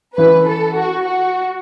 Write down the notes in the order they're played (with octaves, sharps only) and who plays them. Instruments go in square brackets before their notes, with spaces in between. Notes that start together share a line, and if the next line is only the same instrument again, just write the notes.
[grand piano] E3 C#4 E4 [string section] B4
[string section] A4
F#4
F#4